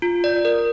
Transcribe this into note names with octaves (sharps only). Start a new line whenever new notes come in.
F4
D5
A#4